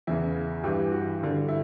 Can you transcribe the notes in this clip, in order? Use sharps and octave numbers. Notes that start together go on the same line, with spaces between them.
E2 C#3 E3 E4
G2 E3 G4
F#4
G2 D3
E4